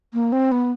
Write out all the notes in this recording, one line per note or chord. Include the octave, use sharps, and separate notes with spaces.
A#3
C4
B3